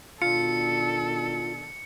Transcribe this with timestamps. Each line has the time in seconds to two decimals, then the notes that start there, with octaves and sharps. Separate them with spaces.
0.22 B2 D#3 D4 F4 A4 C#7